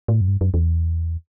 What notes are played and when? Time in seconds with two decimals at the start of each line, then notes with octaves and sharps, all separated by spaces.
0.08 A2
0.21 F#2
0.28 G2
0.41 F#2
0.54 E2